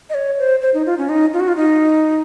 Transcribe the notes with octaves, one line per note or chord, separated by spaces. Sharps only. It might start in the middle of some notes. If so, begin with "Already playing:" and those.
D#5
C#5
C5
C5
D#4
F4
C#4
D#4
F4
F#4
F4
D#4